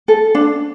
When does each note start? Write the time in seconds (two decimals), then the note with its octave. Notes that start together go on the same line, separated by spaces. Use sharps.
0.08 A4
0.35 D4